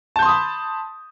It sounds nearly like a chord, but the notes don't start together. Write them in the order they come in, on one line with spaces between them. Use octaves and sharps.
A5 G6 C6 D#6 B5